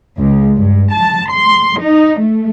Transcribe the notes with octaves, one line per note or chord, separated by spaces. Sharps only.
C#2
G2
A5
C6
D#4
A3